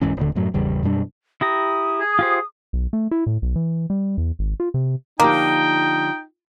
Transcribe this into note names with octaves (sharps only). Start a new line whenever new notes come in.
E1 G#2 E3 C#4
D#1 D2 D3
F#2 A2 F#3
G#1 E2 C#3 G3
F#2 B2 G3 D4
E4 G4 A#5 D#6
G#4
F4 G4 C5
B1
A3
E4
A2
B1
E3
G3
E2
G#1
F4
C3
D3 F3 A#3 D#4 G4 G5